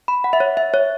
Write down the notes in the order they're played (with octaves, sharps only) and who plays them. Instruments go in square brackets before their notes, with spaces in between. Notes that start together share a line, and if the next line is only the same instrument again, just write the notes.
[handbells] B5
F#5
E5
C#5
E5
C#5